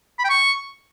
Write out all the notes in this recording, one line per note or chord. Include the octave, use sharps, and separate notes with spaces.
B5
G5
C#6